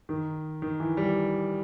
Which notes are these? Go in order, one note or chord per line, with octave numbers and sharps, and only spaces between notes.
D#3
D#3
E3
G3